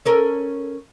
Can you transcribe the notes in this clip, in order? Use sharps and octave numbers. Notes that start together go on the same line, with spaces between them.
C#4 A4 A#4